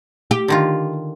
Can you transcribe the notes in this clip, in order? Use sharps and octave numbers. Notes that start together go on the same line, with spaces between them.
G4
D3 D#3 F4